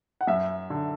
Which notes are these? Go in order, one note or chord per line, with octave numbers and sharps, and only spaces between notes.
F#5
F#2 E5
D3